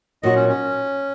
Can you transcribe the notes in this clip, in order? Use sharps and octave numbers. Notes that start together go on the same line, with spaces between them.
A#2 F#3 D#4 F#4 D#5
C#4
C#4